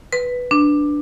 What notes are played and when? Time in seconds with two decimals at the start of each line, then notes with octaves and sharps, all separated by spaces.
0.13 B4
0.51 D4